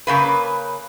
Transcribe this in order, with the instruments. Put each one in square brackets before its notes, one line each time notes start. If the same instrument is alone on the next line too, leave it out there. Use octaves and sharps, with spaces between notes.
[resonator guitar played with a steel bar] C#3 A#3 B4